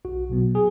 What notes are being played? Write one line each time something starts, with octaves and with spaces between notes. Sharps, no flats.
B1 F#4
B2 F#3 B3
G#4